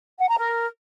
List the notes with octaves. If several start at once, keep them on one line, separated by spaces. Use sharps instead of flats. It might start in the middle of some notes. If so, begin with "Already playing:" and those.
F#5
A#5
A#4